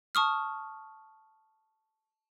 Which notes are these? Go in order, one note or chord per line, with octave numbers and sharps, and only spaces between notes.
A5 C#6 D#6 F6